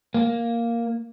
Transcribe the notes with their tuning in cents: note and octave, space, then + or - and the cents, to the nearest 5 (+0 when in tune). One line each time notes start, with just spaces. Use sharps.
A#3 +0